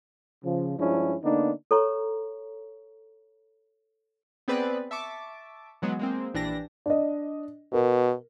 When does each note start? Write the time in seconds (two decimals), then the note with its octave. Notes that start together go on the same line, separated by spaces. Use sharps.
0.44 C#3 F3
0.79 G2 F3 G#3 C#4 D4 E4
1.23 D3 A#3 B3 D4 D#4
1.71 A4 C#5 A#5 C#6
4.48 B3 C4 G#4 B4 D5
4.91 E5 A5 C#6 D6
5.82 E3 F#3 G#3 B3 F#4
5.99 G#3 A#3 C4
6.34 A#1 E3 D4 G4 A#6
6.86 D4 D#5
7.73 B2 A#4